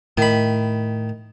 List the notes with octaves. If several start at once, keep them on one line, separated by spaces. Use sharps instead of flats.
A2 D#3 B5